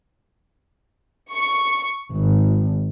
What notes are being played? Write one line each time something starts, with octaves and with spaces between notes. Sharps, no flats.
C#6
G#1